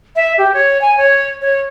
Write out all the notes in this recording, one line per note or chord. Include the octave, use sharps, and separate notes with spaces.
E5
G4
C#5
G#5
C#5
C#5